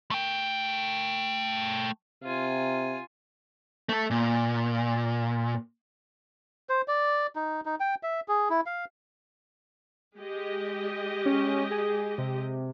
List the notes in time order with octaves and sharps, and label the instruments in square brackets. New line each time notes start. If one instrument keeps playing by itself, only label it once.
[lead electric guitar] A3 G5
[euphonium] C3 [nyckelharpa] F4 G#5
[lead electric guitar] A3 A4
A#2
[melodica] C5
D5
D#4
D#4
G5
E5
G#4
E4
F5
[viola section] G#3 G4 D#5
[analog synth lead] C#4
G#4
C3